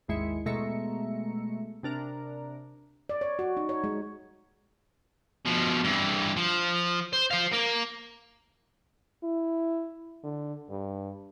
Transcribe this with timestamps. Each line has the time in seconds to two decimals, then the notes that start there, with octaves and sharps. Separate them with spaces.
0.08 G#1 D#2 G#3 E4 C#7
0.46 B2 G#3 A3 E5 A#5 C#7
1.83 C3 D4 A#4
3.09 D5
3.21 C#5
3.39 F#4
3.57 D#4
3.69 C#5
3.84 G#3
5.45 B2 F3
5.84 G2 E3
6.37 F3
7.13 C5
7.31 C5 F5
7.52 A#3 A#4
9.24 E4
10.24 D3
10.70 G2